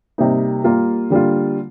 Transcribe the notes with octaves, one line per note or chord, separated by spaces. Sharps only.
C3 G3 A#3 D#4
G3 A#3 F4
D3 G3 A#3 F4